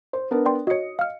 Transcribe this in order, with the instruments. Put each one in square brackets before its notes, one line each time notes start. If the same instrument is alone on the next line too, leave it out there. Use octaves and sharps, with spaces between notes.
[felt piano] C5
B3 D4 A#4
[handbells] D5 G5 C6
[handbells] F#4 C#5 [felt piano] D#5 C#7
[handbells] F5 F6